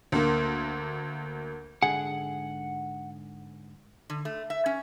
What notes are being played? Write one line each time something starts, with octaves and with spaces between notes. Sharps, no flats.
D2 A#3
G#2 D3 G#4 F#5
D3
A3
E5
C#4